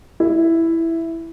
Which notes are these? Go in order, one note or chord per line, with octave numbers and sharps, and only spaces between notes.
E4